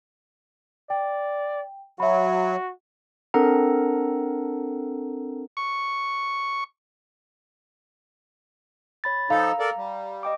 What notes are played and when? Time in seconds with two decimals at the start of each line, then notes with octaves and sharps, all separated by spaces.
0.90 D5 G5
2.00 F#3 F#4 E5 B5
3.34 C4 D4 A4 A#4 F#5 A#5
5.57 C#6
9.04 C#5 B5 A6
9.30 F3 D#4 A4 F5 A#5
9.59 A4 A#4 D5
9.77 G3
10.23 D#5 G5 D6